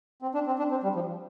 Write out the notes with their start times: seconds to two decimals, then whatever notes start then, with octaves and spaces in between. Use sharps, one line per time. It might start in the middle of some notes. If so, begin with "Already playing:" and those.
0.22 C4
0.34 D4
0.47 C4
0.59 D4
0.71 C4
0.83 G3
0.95 F3